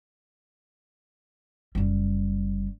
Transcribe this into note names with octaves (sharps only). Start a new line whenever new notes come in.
F#1 G3